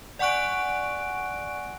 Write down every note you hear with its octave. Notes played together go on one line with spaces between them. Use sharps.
D5 F#5 G#5 C#6 F#6 D7